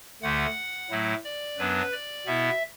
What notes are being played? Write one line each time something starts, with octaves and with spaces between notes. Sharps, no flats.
D2 D3 A3 F#5
A2 F#3 A3 E4
D5
F#2 F#3 B3 D4 B4
D5
B2 B3 E4 E5